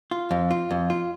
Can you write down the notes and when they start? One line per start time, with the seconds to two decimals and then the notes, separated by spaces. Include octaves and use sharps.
0.11 F4
0.31 F2
0.51 F4
0.71 F2
0.90 F4